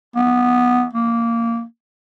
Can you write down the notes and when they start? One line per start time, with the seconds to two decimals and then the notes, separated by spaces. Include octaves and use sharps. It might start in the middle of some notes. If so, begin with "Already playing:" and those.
0.16 B3
0.93 A#3